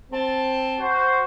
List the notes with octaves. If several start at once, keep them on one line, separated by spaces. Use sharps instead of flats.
C4 A5
F#4 C5